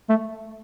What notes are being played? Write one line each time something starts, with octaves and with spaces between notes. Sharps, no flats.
A3